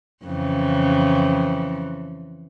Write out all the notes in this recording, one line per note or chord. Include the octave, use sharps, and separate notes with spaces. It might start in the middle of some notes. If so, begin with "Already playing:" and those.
F2 C#3 E3